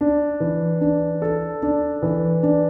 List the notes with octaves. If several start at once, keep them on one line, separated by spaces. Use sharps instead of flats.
D4
E3
D4
A4
D4
E3
D4